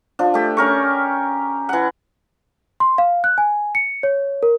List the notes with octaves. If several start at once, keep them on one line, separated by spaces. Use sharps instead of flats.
F3 D4
A3 G4
C#4 A#4 C#6
E3 F#5
C6
F5
F#6
G#5
C#7
C#5
A#4